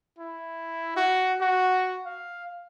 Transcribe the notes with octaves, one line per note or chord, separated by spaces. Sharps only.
E4
F#4
F#4
F5